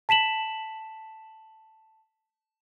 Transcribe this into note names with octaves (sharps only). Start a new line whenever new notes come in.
A5 B6 E7 F#7